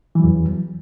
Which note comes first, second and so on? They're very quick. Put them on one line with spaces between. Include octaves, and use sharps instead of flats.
E3 F#3 E2